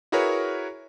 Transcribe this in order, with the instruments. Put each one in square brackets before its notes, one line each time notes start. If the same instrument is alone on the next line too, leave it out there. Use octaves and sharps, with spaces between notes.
[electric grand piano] E4 F#4 G#4 A#4 B4 C#5